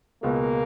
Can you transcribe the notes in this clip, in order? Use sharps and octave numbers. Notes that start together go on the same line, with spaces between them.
C#2 B2 G#3 A#3